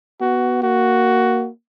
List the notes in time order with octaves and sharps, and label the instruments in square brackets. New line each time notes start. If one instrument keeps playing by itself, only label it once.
[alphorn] B3 [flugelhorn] F#4
[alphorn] A#3 [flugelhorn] F#4